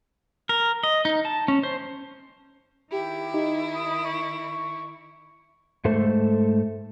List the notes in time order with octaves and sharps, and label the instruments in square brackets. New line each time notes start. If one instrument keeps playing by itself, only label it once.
[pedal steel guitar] A#4
D#5
D#4
A5
C#4
C5
[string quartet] D#3 E4 [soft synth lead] G4
[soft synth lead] D#4
D#6
C#6
[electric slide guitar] G#2 A3 A4 C5